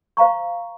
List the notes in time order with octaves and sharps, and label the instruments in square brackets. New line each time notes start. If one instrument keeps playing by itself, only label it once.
[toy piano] C5 F5 A#5 C#6